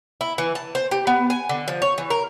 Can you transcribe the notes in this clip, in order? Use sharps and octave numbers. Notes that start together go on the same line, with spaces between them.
E4
E3
A5
C5
G4
B3
G#5
D3
F3
C#5
E3
A#4